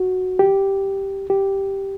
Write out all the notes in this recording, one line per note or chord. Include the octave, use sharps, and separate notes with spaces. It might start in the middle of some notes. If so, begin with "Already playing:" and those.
Already playing: F#4
G4
G4